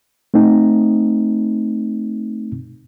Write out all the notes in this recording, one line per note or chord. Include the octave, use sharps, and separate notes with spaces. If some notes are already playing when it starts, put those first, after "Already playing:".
A3 C4 D#4